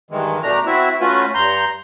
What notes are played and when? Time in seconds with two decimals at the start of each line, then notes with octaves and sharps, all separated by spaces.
0.11 G2 D#3 E3 G#3
0.43 B2 A3 D4 A#5
0.66 C4 E4 F#4 E5
1.01 A3 C#4 F4 F#4 B4
1.35 G2 A#5 C6 G6